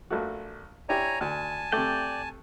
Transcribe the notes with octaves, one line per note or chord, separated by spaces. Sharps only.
A#1 A3 F#4
D4 E4 G4 C#5 G#5 A#5
D2 G#5 A5
C3 A3 D5 G5